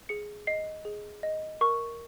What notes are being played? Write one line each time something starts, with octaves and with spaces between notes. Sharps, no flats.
G#4 C#7
D#5 C7
G#4
D#5
A#4 C#6